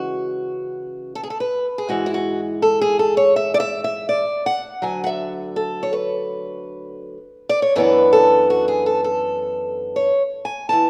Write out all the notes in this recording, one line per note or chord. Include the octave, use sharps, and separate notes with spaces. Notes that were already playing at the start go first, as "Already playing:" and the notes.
Already playing: C#3 E3 G#3 F#4
A4
G#4
A4
B4
G#4
G#2 E3 G#3 F#4
E4
F#4
A4
G#4
A4
C#5
E5
D5
E5
E5
D5
F#5
D2 D3 F#3 G#5
F#5
E5
A4
C#5
B4
D5
C#5
F#2 E3 B3 D4 B4
A4
F#4
G#4
A4
A4
C#5
G#5
E3 B3 A5